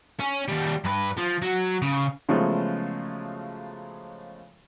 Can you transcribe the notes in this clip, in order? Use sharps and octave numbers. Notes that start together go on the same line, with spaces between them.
C#4
D#2 G3
G2 B4
F3
F#3
C#3
C#3 F3 F#3 G#3 A3 B3